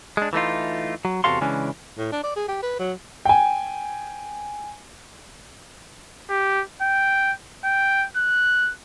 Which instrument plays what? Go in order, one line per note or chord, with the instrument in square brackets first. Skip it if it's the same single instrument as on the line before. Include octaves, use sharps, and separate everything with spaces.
[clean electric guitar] G#3 D4
E3 A3 D#4 F4
F#3
E2 C3 F#4 A4 F5 C6
C#3 E3 G#3 C#4 D4
[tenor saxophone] A2
D4
D5
G#4
G4
B4
F#3
[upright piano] G5 G#5
[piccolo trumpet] G4
G5
G5
F#6